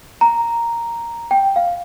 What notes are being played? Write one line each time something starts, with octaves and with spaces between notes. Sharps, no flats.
A#5
G5
F5